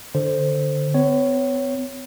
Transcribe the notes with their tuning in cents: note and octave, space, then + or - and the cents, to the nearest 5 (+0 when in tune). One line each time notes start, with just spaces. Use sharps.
D3 +0 C5 +0
B3 +45 C#5 +0